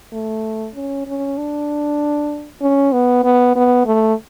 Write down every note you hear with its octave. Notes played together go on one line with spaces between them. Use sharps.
A3
C#4
C#4
D4
C#4
B3
B3
B3
A3